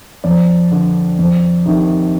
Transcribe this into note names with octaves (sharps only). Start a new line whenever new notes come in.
F2 D5
D3
F2
C3 D#3